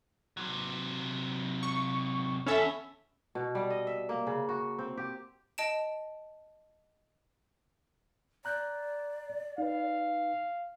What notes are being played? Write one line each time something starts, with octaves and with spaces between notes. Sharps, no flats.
C3 F#3
C#6
E2 C#4 A4 E5
B2
G3
D#5
E5
A#3
C#3
F#4
C4
G4
D#5 A5 D7 E7
D5 A#5 F#6 G6
D#4 B4 F5